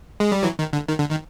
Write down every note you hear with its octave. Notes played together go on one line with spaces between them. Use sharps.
G#3
G3
E3 F#3
D#3
D3
D#3
D3
D#3